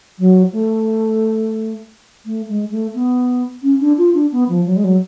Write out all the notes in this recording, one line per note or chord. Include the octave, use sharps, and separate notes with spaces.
F#3
A3
A3
G#3
A3
B3
C#4
D4
F4
D4
B3
F3
F#3
G#3
F#3